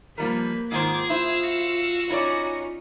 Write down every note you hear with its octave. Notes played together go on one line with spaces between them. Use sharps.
F3 G3 A#3 A#4 B4
G#2 D#3 F4 G#4 C5 D6 G#6
E4 C5 F5 E6
F#4
C#4 D#4 E4 C#5 D5